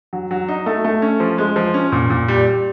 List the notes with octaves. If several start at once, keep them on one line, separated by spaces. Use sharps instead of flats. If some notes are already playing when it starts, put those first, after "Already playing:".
F#3
F#3
D#4
A3
A3
C#4
F3
G#3
F3
C#4
A#2
A#2
G3
G3